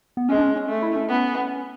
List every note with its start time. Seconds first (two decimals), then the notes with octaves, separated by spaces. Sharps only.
0.17 B3
0.29 G#3 C#4
0.38 D4
0.42 C#4
0.56 C#4
0.69 A3
0.82 E4
0.96 C#4
1.09 B3